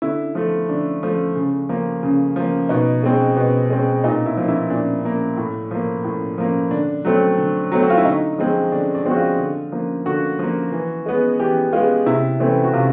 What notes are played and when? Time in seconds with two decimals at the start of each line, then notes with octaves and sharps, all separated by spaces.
0.02 D3 E4
0.35 F3 A3
0.69 D3 D4
1.03 F3 A3
1.36 C#3
1.69 F3 A#3
2.03 C#3
2.36 F3 A#3
2.69 B2 D#4
3.03 G#3 C4
3.37 B2
3.70 G#3 C4
4.04 A#2 D#4
4.26 E4
4.37 F3 A#3
4.48 E4
4.70 A#2 D4
5.04 F3 A#3
5.37 A2
5.71 F3 A#3
6.04 A2
6.38 F3 A#3
6.71 D3 D4
7.05 F#3 A3 C4
7.38 D3
7.72 F#3 A3 C4
7.83 F#4
7.90 F4
7.98 E4
8.05 D3 D#4
8.38 F3 G#3 C4
8.72 D3 D4
8.95 D4
9.06 F3 G#3 C4 F#4
9.17 F4
9.39 D3
9.72 F3 A#3
10.06 D3 F#4
10.39 F3 A#3
10.72 E3
11.06 G#3 B3
11.40 E3 G4
11.73 G#3 B3 F4
12.06 C3 E4
12.40 E3 A3 C4
12.64 F#4
12.73 C3 F4